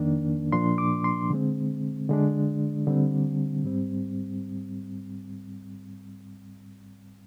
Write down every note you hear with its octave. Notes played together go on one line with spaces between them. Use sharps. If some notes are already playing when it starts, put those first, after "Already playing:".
Already playing: F2 D#3 A#3 D4
A#2 F3 A#3 D4 C6
D6
C6
D3 G#3 C4
D3 G#3 D4
D3 G3 C4
G#2 G3 C4